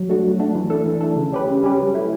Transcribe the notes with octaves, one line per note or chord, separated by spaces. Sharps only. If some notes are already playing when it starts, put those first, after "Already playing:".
Already playing: F#3
A3 D4 F#4
F#3
A3 D4 F#4
E3
A3 D4 A4
E3
A3 D4 A4
C#3
G3 C#4 G4 B4
C#3
G3 C#4 G4 B4
F#3
A3 E4